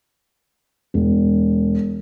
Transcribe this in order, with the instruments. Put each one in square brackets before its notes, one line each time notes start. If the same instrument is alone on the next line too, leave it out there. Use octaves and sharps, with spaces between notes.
[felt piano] E1